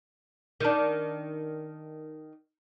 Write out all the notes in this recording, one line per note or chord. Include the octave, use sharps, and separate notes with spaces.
D#3 D4